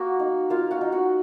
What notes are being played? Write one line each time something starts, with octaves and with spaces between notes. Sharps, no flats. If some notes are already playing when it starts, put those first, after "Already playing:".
Already playing: A#3 F#4 F#5
D#4
A#3 F4 F5
F#4 F#5
D#4
F#4 F#5